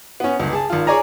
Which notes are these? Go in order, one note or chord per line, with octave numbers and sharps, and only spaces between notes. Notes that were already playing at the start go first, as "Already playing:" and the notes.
B3 C#4
G1 C#2
G#4 A5
G#1 F4
G#4 C#5 D5 G#5 A#5